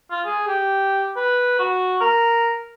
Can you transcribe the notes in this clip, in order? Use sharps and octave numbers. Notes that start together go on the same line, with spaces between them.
F4
G#4
G4
B4
F#4
A#4